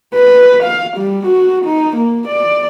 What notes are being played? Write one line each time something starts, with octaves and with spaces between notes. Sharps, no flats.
B4
F5
G3
F#4
D#4
A#3
D5